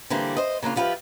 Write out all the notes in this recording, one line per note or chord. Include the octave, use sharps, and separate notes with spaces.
D3 E3 G3 A#3 C4
C5 D#5
C#3 A#3 D4 F4
F3 E4 F4 G4 A#4 B4